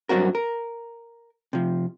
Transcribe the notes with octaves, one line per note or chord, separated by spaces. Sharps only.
G2 B2 F#3 C4 F#4 A#4
A#4
C3 F3